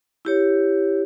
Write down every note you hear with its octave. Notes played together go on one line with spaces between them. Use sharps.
E4 G4 C#5